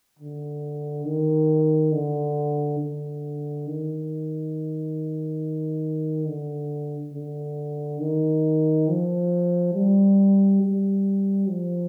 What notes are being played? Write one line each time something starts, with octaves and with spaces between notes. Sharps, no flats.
D3
D#3
D3
D3
D#3
D3
D3
D#3
F3
G3
G3
F3